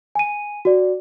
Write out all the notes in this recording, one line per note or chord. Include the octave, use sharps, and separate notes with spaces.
G#5 D#7
F#4 D5